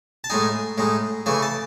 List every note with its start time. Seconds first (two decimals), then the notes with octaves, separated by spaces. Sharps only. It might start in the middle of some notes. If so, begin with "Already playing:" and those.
0.24 A5
0.30 A2 G#3 D#4 G#5
0.78 A2 G#3 D#4
1.26 C#3 E3 A3 G#5
1.42 A5